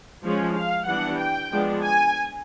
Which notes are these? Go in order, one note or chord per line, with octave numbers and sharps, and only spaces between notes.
F3 G#3 C#4
F5
E3 G3 B3 D4 F#5
G5
F3 G#3 B3 D4
G#5